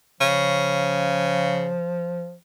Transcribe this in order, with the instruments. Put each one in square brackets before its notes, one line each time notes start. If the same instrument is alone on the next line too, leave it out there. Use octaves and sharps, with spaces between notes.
[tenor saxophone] C#3 [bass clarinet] F3